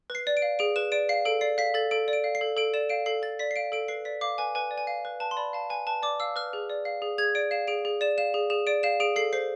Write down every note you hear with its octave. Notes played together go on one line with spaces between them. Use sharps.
B4
C7
D5
D7
F5
G#4 D7
B4 E7
D5 D7
F5 C7
A4 D7
D5 C7
F5 B6
A4 A6
A4 D7
D5
D7
F5
C7
A4
A4 D7
D5 E7
F5 D7
A4 C7
A4 A6
D5 B6
C7
F5 D7
A4 D7
B4 C7
D5 B6
F5 D6
B4 G#5
B4 G#5
D5
G#5
F5
B4
B4 A5
C6
D5 B5
F5 A5
B4 G#5
B4 A5
D5 D6
F5 E6
B4 F6
G#4
D5
F5
G#4
G#4 G#6
D5 D7
F5 E7
G#4 D7
G#4
D5 E7
F5 E7
G#4
G#4 E7
D5 D7
F5 E7
G#4 D7
A4 C7
C5 C7